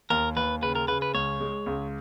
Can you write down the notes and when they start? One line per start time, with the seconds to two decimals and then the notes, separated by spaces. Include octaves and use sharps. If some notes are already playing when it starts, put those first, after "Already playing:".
0.10 D#2 A#4
0.36 D#2 B4
0.62 C#3 B4
0.75 A#4
0.88 C#3 B4
1.02 B4
1.14 C#2 C#5
1.40 G#3
1.66 C#2